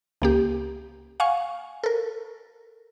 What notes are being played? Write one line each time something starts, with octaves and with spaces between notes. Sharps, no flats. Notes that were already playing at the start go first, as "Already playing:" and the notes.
C#2 A#3 G4
F5 F#5 G#5 C#6
A4 A#4